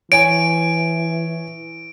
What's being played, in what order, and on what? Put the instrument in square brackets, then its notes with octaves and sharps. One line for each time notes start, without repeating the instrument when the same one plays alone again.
[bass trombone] E3 [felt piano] C#5 G#5 [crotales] D7